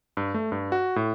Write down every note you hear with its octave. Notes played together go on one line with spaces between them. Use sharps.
G2
A3
G2
F#4
A2